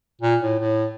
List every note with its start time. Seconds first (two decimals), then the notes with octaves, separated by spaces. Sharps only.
0.22 A#2
0.42 A2
0.60 A2